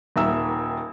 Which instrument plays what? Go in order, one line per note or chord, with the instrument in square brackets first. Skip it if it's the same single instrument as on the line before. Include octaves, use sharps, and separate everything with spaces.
[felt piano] D#1 D#2 E5 A#5 E6